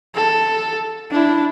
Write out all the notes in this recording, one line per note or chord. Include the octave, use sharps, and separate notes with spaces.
A4
D4 E4